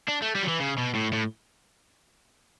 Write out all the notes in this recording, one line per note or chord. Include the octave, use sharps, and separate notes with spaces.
D4
A3
G3
F#3
E3
C#3
B2
A2
A2